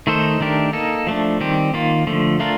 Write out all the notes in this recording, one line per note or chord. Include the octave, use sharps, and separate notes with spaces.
D#3 A3 D#4 A4 C5
D#3 A3 D4 G4 A#4
A#3 D#4 A4
F3 A3 D4
D#3 G3 C4 G4
D#3 A#3 F4
D3 F3 A3
A3 D4 F4 A#4